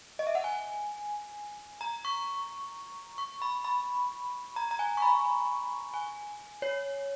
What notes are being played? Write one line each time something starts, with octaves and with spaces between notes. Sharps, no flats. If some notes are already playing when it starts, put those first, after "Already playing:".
D#5
E5
F#5
G#5
A#5
C#6
C#6
B5
B5
A#5
A#5
G#5
C#6
B5
G#5
C#5